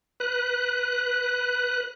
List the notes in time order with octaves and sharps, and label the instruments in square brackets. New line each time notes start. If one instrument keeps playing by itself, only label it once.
[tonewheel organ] B4 F#6